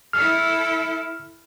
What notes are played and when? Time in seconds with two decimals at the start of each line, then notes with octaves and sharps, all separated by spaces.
0.13 E4 A4 F6